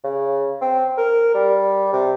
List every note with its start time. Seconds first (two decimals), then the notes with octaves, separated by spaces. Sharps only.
0.04 C#3
0.61 C4
0.98 A#4
1.34 G3
1.93 C3